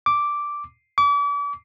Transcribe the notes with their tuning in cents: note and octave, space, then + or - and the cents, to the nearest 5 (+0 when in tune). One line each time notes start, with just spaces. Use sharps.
D6 -5
D6 -40